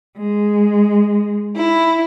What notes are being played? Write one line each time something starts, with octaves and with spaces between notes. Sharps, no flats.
G#3
E4